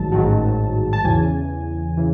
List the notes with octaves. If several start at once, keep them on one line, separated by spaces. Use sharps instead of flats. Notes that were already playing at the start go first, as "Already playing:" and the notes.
Already playing: A1 G#2 D#3 F#3 A5
A1 G#2 D#3 F#3
A5
E2 C#3 E3 G#5
C#3 E3